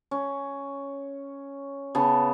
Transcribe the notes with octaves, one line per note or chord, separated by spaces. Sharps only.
C#4
C#3 B3 A5